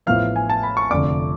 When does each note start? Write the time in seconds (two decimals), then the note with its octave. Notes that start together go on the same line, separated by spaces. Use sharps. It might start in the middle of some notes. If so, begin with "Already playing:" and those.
0.06 A1 A2 F3 B3 F5 F6
0.36 G#5
0.50 A5
0.63 B5
0.77 C#6
0.91 F1 F2 D3 D5 D6